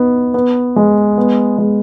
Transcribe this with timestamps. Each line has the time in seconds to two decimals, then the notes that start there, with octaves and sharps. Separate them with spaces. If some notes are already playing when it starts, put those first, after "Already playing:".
Already playing: B3 D#4
0.34 B3
0.76 G#3
1.18 B3
1.58 G#3